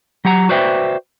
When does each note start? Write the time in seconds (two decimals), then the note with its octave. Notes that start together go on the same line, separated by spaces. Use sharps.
0.25 F#3 G4 F#5 A#5
0.49 F#4 B4 C5 D5 E5 G5